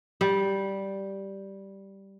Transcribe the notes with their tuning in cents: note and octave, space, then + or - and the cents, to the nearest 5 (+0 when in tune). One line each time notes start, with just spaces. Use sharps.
G3 -5